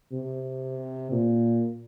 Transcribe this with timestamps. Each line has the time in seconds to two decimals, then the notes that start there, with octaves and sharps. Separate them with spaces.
0.12 C3
1.12 A#2